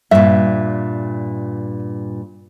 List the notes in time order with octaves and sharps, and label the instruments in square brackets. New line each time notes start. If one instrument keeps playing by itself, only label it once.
[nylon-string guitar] G2 A#2 [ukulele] E5